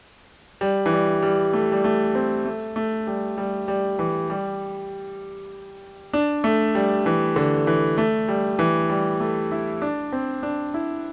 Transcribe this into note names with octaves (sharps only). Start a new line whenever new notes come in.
G3
E3
G3
G3
A3
G3
A3
C4
A3
A3
G3
G3
G3
E3
G3
D4
A3
G3
E3
D3
E3
A3
G3
E3
G3
A3
E4
D4
C4
D4
E4